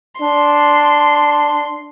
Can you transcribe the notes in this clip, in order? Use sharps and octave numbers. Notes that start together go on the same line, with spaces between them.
D4 C6